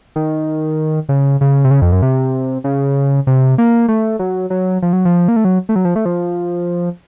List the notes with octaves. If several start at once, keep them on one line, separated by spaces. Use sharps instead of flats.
D#3
C#3
C#3
C3
C#3
F2
F#2
C3
C#3
C3
A#3
A3
F#3
F#3
F3
F#3
F3
A#3
A3
F#3
A3
F#3
F3
A3
F3